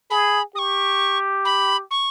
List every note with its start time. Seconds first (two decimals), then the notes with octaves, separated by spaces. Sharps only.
0.10 G#4 B5
0.55 G4 C#6 D#6
1.45 B5
1.91 C#6